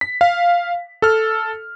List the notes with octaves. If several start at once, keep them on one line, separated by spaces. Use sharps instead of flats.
B6
F5
A4 F6